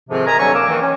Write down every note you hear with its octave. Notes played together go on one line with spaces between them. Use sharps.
F2 G#2 C3 D#3 F3 C4
A#4 D#5 E5 G#5 A#5
G2 D3 F#3 C#5 G#5 C#6
A#3 D6 E6
D#3 E3
C#4